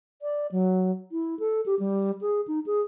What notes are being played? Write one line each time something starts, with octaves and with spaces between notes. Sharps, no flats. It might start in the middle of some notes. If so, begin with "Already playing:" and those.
D5
F#3
E4
A4
G4
G3
G#4
D#4
G#4